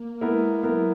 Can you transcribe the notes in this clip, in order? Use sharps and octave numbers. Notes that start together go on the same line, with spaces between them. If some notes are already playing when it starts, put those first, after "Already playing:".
Already playing: A#3
G#3 B3 E4 A#4
F#3 B3 E4 A#4